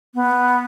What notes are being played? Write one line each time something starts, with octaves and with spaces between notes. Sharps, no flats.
B3